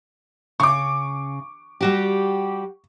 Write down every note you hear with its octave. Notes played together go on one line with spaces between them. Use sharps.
C#3 C#6 D6
G3 F#4 G4